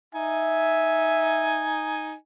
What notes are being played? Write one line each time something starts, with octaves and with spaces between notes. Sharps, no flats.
D#4 E5 G#5